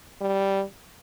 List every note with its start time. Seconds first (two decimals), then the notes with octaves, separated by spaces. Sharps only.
0.21 G3